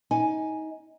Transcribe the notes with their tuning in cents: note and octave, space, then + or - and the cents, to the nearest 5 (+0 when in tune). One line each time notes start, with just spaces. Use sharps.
D#4 +25 G#5 +0